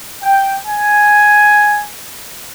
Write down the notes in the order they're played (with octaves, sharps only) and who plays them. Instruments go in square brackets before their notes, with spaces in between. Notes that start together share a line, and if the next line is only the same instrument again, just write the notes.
[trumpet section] G5
G#5